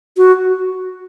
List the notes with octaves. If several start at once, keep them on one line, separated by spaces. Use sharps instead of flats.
F#4